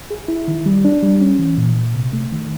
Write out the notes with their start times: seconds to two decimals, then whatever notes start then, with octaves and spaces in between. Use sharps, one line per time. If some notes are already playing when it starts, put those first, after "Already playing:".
0.11 G#4
0.28 E4
0.48 D#3
0.66 G3
0.85 D4
1.03 G3
1.21 C#4
1.39 E3
1.58 A#2
1.76 A#2
1.95 C3
2.13 A3
2.32 D#3